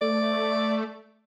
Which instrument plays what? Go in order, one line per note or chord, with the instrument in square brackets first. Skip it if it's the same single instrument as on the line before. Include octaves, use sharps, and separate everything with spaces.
[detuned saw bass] A3 [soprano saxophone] D5